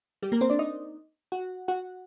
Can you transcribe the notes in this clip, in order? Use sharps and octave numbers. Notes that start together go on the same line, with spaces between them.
G3 G4
A#3 A#4
C4 C5
D4 D5
D#4 D#5
F#4 F#5
F#4 F#5